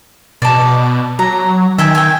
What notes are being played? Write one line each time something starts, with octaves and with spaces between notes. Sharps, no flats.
B2 D5 A5
F#3 A#5
D#3 E5 G5 G#5
G5 G#5